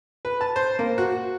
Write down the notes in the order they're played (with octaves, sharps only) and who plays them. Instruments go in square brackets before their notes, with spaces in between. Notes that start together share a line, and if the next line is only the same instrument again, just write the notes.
[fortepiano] B4
A5
C5
A#3
F#4